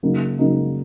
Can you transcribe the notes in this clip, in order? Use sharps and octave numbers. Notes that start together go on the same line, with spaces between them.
C#3 F#3 A#3 D#4
C#3 F#3 A#3 D#4